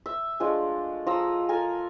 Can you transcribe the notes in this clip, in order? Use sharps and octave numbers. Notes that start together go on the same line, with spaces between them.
E5
F3 G#3 A3 D4
F3 A#5 D#6 E6
A4 A#4 G#5